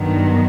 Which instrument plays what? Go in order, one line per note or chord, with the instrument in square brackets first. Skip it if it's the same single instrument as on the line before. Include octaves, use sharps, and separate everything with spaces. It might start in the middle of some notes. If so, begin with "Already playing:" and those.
Already playing: [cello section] G2 D#3 F#3 B3